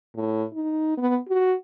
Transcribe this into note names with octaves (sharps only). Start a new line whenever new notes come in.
A2
D#4
B3
F#4